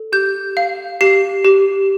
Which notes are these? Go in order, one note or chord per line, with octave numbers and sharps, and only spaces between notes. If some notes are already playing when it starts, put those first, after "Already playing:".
Already playing: A4
G4 G6
F5
G4 C7
G4